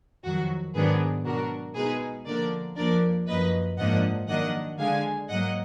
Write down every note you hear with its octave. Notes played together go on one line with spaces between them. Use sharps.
F2 D#3 F#3 F#4
G#2 D#3 F#3 B3 D4 G#4 B4
B2 F#3 D4 F#4 A#4
B2 G#3 D#4 G#4 B4
D3 F3 A#3 D4 A#4 D5
F2 F3 A#3 D4 A#4 D5
F#2 F3 A#3 B4 D#5
G#2 F3 A#3 D4 D#5 F#5
D#3 F#3 A#3 D4 D#5 F#5
D3 G#3 D4 F5 G#5
G#2 F#3 A#3 D#5 F#5